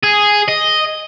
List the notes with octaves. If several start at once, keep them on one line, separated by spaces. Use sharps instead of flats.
G#4
D#5